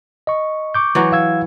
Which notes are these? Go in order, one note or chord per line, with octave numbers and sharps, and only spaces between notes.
D#5 C#6
C#6 D6 G6
E3 F#3 F#4
F5 E6 G#6